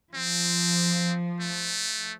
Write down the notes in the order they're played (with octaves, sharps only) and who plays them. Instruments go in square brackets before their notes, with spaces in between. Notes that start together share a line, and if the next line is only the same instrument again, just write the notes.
[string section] F3 [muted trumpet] C4
[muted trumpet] A3